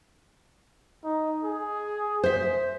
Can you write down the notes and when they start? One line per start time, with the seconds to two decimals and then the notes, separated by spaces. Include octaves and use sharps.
1.04 D#4
1.43 G#4
2.24 C5 E5